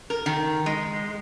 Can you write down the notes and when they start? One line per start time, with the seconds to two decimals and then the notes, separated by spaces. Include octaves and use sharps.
0.10 A#4
0.26 D#3
0.66 G#3